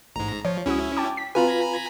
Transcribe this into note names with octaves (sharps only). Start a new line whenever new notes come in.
A1 G#2 A#5
F3 C#5
C#2 C#4 E4 F#4 D#6
G5 A5 D6
B6
C4 F4 F#4 B4 G#5 A#5 B5